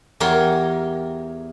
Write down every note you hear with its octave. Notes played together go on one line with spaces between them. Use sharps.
E2 G4 A#4 C#5 C6